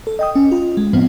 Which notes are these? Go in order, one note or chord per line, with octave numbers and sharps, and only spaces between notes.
A4
D#5 G5 D#6
C#4
F4
G#3
A2 F3 B3 C4